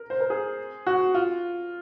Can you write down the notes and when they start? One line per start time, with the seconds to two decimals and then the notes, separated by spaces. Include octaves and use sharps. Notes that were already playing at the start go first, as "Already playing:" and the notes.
Already playing: A#4
0.10 C5
0.20 A#4
0.30 G#4
0.87 F#4
1.14 F4